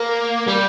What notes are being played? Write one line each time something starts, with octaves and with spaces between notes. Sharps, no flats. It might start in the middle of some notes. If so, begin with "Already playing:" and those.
Already playing: A#3
G3